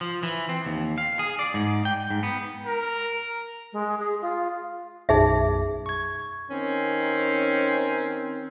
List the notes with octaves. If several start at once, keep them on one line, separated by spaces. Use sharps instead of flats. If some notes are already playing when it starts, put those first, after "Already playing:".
F3
E3
C4
D#2
F5
G#4
D5
G#2
G5
G#2
B3
A#4
G#3
G#4
F4
B1 F#2 D#4 G#4 E5
C#6 G#6
D#3 C4 C#4